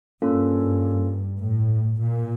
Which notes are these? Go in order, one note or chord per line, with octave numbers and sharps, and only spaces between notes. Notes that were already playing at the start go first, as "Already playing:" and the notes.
G2 A#3 C#4 F4 A4
A2
A#2